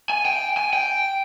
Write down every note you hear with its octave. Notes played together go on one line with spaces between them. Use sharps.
G#5
G5
G#5
G5